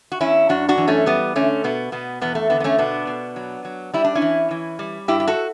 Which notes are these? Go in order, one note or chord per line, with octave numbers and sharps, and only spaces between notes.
F#4
E2 C#4 E4
F#2 D4 F#4
D4 F#4
E3
A3 C#4
G3 B3
D3 A3 C#4
B2 B3
B2 B3
E2 B3
A3
D3 B3
B3
A3 C#4
B2 B3 D4
B2
F#3
F#3
G3 E4
D4
C#4 E4
E3
E3
G3
G2 E4 G4
G4
F#4 A4